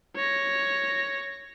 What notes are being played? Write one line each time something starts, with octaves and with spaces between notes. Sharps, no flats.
C#5 A#6